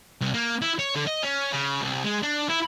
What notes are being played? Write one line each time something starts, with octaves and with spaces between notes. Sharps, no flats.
C2
A#3
E4
C#5
D3
D#5
C#4
C#3
C2
G#3
D4
E4